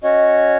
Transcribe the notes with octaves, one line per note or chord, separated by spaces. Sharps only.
C#4 F#4 C#5 D#5